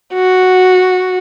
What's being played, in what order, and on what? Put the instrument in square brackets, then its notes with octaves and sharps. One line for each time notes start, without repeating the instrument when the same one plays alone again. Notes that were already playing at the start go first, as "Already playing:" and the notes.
[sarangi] F#4